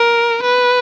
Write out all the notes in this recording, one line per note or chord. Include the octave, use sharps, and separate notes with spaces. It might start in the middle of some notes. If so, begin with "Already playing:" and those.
Already playing: A#4
B4